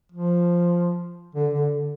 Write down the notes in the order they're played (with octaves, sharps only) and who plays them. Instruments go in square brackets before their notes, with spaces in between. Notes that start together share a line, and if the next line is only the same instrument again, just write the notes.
[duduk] F3
D3
D3